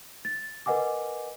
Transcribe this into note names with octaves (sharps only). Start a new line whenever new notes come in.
A6
A#4 B4 D#5 F#5 G#5 D6